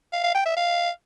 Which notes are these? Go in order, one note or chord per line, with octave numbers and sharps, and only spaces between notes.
F5
F5
G5
E5
F5